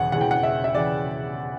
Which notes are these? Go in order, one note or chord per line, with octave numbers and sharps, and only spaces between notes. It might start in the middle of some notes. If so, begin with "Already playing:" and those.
Already playing: E1 E2 C#3 E3 F#5
E1 E2 C#3 E3 F#5
G5
F#5
E5
E5
C#3 E3 D5